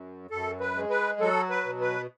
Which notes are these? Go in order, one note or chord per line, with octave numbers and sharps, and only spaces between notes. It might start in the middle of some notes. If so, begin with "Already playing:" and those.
Already playing: F#2
F#2 A4
B4
G#3
B4
F#3 A4
B4
B2
B4